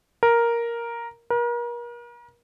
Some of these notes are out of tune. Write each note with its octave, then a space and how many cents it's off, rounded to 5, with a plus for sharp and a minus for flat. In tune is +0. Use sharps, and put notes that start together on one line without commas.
A#4 +5
A#4 +40